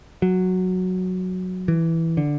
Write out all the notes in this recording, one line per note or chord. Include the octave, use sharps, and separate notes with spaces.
F#3
E3
D3